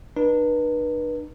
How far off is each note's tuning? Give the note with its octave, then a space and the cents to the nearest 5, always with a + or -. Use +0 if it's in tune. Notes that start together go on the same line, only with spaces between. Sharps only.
D4 +45 B4 -35